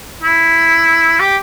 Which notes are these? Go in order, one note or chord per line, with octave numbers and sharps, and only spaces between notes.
E4
G4